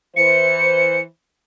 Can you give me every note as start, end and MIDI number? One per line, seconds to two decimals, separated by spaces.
0.16 1.02 52
0.16 1.02 72
0.16 1.01 97